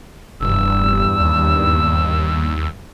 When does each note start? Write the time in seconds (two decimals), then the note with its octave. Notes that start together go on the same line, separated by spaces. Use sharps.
0.41 F1 E2 G2 E6
1.20 D#2